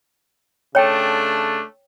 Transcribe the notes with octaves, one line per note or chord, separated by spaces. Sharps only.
C#3 A3 D4 C#5 G5